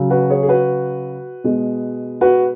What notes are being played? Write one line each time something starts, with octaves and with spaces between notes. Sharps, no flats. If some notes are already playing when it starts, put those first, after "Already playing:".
Already playing: C#3 F#3
F#4 B4
G#4 C#5
G#4
F#4 B4
B2 G#3
F#4 B4